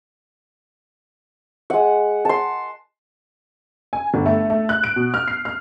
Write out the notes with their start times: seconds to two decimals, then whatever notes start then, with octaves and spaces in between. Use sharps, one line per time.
1.70 G#3 F#5
2.25 A5 C6
3.93 G#5
4.14 G1
4.26 A3
4.50 A3
4.69 F#6
4.84 D7
4.96 B2
5.14 F6
5.28 C7
5.45 F6